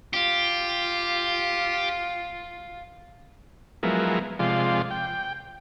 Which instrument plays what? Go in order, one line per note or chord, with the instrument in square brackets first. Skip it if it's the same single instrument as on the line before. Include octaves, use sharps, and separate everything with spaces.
[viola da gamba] F4 [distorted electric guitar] G4
[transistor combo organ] F3 F#3 G#3 B3 E4 A#4
C3 F3 G#3 F4 D5 C6
G5